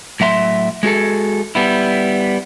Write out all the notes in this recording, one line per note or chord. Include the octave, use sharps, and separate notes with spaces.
A2 F#3 E5 A#5 C6
G#3 F#4 G#4 A4
G3 B3 E4